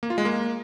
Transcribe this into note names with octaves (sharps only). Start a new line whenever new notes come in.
A#3
F4
G#3
A#3